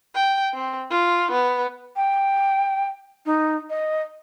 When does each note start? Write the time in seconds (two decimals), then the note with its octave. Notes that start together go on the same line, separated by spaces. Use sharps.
0.15 G5
0.54 C4
0.91 F4
1.31 B3
1.96 G5
3.26 D#4
3.70 D#5